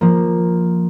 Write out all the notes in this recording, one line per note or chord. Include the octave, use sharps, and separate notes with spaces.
F3 A#3